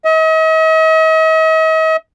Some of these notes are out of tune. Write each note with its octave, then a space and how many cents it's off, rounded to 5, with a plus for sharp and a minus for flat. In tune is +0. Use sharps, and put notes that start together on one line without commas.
D#5 +45